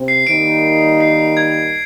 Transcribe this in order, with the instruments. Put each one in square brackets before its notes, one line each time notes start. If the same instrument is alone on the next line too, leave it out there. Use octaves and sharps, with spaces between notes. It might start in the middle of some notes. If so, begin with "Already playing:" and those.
Already playing: [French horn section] C3 C4
[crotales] C7
[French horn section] D#3 G3 A#3 D#4 A#4 [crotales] D7
[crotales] C7
G#6